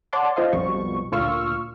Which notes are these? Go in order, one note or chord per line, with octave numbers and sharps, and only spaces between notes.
C#5 D5 F#5 A5 C6 D6
F4 C5 D#5 F5
B1 F2 B2 F3 G3 C#6
D2 A#2 F4 C#6 E6 F6